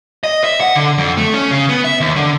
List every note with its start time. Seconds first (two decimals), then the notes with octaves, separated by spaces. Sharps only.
0.24 D#5
0.44 E5
0.60 F#5
0.76 D3
0.98 F2
1.17 A3
1.34 C#4
1.51 C#3
1.69 B3
1.84 E5
2.01 D#2
2.16 D3